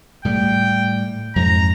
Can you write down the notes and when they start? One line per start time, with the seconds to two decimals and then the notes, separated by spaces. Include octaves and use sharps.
0.25 A2 G3 G5
1.36 F2 G#2 A#5